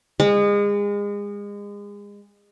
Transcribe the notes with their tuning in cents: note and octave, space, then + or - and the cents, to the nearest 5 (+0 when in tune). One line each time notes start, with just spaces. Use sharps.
G#3 -30